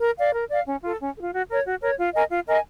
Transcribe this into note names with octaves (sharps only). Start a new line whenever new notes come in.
A#4
D5 F5
A#4
D5 F5
C#4
F4 A4
C#4
A4
F4
F#4
A#4 C#5
F#4
A#4 C#5
F4
A#4 D#5 G#5
F4
A#4 D#5 G#5